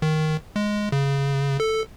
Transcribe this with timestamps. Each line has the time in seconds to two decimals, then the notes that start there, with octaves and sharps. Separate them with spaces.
0.02 D#3
0.56 G#3
0.92 C#3
1.60 A4